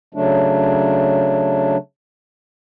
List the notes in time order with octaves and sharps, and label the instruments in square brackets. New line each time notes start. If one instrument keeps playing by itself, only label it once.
[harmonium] C#3 F#3 A3 D4